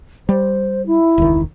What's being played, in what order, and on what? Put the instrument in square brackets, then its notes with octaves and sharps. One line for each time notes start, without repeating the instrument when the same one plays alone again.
[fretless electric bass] G3 [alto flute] C5
[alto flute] E4
[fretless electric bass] E1 C#2 D#3